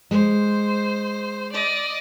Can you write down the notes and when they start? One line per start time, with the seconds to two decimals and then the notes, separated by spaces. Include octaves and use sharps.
0.11 G#3 C5
1.53 D5 D#5